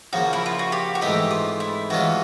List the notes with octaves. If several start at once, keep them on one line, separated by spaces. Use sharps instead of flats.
C#3 F3 A#3 F#4
E4
F4
F#4
G4
F#4
G#2 E3 A3 C4 D#4 G4
F4
E4
C3 E3 G#3 C#4 F4 F#4